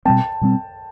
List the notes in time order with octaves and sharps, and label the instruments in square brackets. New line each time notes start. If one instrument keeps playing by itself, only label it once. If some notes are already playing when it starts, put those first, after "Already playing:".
[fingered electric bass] B2 G3 C4 [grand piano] G5 A5
[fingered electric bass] B2 G3 C4